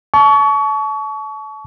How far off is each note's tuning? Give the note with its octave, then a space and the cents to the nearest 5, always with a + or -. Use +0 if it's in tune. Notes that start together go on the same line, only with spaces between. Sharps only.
A5 -30 C#6 +30